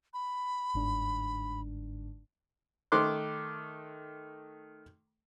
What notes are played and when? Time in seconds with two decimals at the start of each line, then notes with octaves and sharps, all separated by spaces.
0.14 B5
0.74 G1 G#2 D4
2.92 D#3 A3 C6 D6 F#6